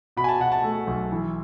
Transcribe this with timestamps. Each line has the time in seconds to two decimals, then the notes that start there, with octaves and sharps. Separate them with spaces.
0.17 B2 B5
0.24 G#5
0.29 A5
0.40 B2 F#5
0.52 A5
0.64 A3
0.87 B1
1.12 E3